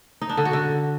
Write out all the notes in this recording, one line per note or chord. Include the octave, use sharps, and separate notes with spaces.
D#4
D4
D3
F#4
D3